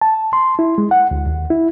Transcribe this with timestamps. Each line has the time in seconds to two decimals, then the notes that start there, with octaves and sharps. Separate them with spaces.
0.02 A5
0.33 C6
0.59 E4
0.78 G#3
0.91 F#5
1.11 D2
1.26 D#2
1.50 E4